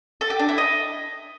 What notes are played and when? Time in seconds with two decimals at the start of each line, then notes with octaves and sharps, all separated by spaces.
0.21 A4
0.30 G4
0.39 D4
0.49 E4
0.58 D#5